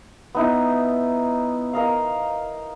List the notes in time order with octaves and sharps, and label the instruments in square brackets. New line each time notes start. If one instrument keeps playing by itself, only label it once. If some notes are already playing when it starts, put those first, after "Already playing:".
[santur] B3 D#4 E4
A#4 D#5 F5